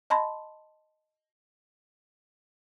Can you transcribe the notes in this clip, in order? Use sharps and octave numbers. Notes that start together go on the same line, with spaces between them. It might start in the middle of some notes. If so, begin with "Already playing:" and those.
D#5 A5 B5 C6